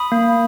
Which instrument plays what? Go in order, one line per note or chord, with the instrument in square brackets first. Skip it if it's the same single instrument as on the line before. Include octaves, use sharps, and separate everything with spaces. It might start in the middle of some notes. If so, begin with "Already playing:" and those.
Already playing: [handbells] B5 D#6
A#3